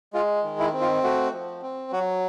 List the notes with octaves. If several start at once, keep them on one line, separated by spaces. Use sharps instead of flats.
G#3 F4
D#3
E4
C4
F4
A3 F#4
F3
C4
F#3 F#4